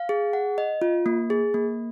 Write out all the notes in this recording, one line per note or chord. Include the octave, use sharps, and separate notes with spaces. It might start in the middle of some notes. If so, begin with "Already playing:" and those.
Already playing: F5
G#4
F#5
D#5
F4
A#3
G#4
A#3